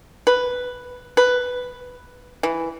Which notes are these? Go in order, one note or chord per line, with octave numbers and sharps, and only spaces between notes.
B4
B4
E3